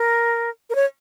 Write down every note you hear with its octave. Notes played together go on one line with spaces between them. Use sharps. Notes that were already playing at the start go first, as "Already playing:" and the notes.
Already playing: A#4
A#4
C#5